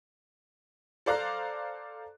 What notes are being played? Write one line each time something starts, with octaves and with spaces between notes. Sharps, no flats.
A4 C5 D5 F5 A#5 F#6